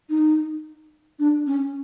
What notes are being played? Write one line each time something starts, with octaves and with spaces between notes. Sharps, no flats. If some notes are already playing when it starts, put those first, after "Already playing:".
D#4
D4
C#4